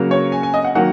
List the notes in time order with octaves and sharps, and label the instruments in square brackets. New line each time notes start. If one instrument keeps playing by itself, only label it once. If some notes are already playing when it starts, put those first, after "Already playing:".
Already playing: [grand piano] C#3 F#3 A#3
C#5
G#5
G#5
D#5
F#5
D#3 F#3 A#3 F#5